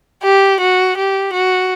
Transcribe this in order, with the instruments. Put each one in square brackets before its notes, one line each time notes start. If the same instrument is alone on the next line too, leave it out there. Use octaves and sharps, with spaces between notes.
[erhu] G4
F#4
G4
F#4